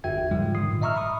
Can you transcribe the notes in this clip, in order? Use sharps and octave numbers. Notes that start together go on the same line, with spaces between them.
G1 E2 F#4 E5 G5 G#6
G#2 C#3 F3 G3 G#3 F4
G#2 D3 D#3 D#6 C7
A#2
D#5 E5 A#5 C#6 E6 F6
B5 C#6 D#6